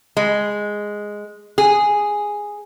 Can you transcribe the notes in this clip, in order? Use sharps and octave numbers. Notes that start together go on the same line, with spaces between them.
G#3
G#4